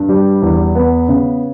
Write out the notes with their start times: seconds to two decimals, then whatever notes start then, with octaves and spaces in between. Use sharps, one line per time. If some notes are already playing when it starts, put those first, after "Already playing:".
Already playing: G2
0.09 G3
0.42 E2
0.75 B3
1.09 C#3